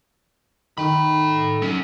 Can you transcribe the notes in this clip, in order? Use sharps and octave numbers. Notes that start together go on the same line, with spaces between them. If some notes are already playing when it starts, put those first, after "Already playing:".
D#3 A4 B5
F#3 C#4